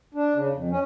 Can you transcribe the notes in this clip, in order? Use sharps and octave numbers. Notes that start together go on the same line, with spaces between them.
D4
C#3
F2
C#4